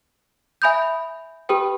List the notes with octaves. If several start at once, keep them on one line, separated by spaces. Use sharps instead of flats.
E5 G#5 B5 D#6 G6
G4 B4 G5 B5 D#6